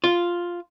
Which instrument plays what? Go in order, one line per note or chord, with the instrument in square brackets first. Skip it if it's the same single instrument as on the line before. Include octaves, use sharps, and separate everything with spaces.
[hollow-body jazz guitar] F4